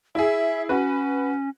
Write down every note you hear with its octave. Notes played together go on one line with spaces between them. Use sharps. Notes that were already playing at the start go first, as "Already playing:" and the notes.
E4 G#4 E5
C#4 F#4 B4